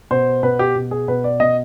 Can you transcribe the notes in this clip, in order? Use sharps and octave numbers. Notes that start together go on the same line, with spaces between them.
B2 C5
B2 B4
G4
B2
G#4
B2 B4
D5
B2 D#5